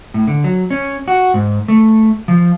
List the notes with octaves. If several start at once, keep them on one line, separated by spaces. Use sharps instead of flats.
A2
D3
F#3
C#4
F#4
G#2
A3
F3